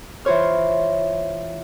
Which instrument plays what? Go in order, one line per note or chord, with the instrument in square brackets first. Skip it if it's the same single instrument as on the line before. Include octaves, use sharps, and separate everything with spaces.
[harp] E3 F4 C5 C#5 F6